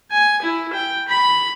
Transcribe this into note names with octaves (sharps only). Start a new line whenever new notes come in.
G#5
E4
G5
B5